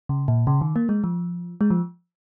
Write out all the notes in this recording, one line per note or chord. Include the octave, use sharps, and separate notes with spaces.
C#3
A#2
C#3
D#3
A#3
G#3
F3
G#3
F3